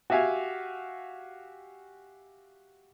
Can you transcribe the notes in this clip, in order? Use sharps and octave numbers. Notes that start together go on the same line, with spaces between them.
F#4 G4 E5 F5 G#5